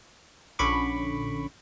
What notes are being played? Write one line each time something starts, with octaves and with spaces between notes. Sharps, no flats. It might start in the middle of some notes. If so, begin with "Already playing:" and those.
A#1 D3 C#4 B5 C#6 D6